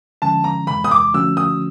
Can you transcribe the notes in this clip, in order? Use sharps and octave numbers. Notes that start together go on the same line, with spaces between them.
D3 F3 G#3 C#4 A5
A#5
E2 C3 E3 G#3 B5
D#6
D6
D3 F3 A3 C#4 F#4 E6
D#6